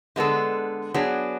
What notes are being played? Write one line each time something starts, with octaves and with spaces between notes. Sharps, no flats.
D3 G#3 B3 D4 A4
F#3 B3 D4 G#4